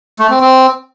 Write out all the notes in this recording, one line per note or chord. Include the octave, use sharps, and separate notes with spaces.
A3
C4
C4